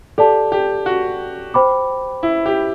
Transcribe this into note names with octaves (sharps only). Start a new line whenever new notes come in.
G4 A4 D5 A5
G4
F#4
C5 G5 B5 D6
E4
G4